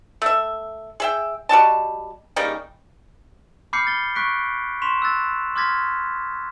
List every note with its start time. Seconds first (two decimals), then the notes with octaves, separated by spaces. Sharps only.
0.22 A3 E5
1.00 G#4 E5 G5
1.49 G3 F#4 D#5 A5
2.36 C#3 G3 A#3 D#4
3.73 B5 D6 F6 G6 C7 C#7
3.87 A6 G7
4.15 C#6 F#6 B6 D7
4.82 C6 C#6 B6 E7 F7
5.02 E6 F#6 A6
5.56 C6 D6 F6 G#6 A6 B6